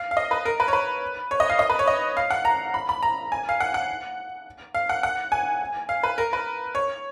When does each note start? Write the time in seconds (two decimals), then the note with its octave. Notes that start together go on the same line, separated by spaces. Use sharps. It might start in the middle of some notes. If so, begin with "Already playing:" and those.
Already playing: F5
0.11 F5
0.17 D#5
0.31 B4
0.45 A#4
0.60 B4
0.68 C#5
0.73 B4
1.31 C#5
1.40 D#5
1.50 F5
1.59 D#5
1.70 B4
1.79 C#5
1.88 D#5
2.17 F5
2.30 F#5
2.45 A#5
2.74 B5
2.89 B5
3.03 A#5
3.32 G#5
3.49 F5
3.60 F#5
3.74 F#5
4.74 F5
4.89 F#5
5.03 F#5
5.32 G#5
5.89 F5
6.03 B4
6.18 A#4
6.33 B4
6.75 C#5